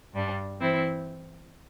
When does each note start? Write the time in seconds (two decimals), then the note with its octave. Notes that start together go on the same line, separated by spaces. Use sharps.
0.14 G2 G3 D4
0.60 E3 C4 E4 C5